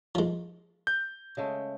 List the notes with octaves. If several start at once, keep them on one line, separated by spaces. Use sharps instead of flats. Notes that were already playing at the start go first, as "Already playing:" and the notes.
F3 G#3
G6
C#3 G#3 A3